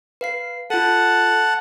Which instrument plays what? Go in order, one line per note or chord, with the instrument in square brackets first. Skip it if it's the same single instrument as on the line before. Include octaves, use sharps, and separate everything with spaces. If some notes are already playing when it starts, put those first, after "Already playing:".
[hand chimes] B4 F5 C7
[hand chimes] F4 A4 [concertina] F#5 A5